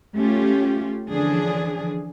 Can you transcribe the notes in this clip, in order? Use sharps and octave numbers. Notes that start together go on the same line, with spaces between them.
A3 C#4 F4 G4
D3 E3 F3 C#4 D4 G#4